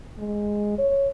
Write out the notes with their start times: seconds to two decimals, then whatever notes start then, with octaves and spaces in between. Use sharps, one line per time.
0.18 G#3
0.78 C#5